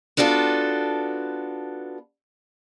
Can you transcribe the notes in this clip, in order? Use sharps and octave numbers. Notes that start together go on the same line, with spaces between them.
B3 D4 F4 F#4 A4